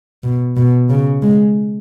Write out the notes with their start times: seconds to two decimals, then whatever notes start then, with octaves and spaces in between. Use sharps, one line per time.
0.23 B2
0.57 B2
0.89 C#3
1.22 G#3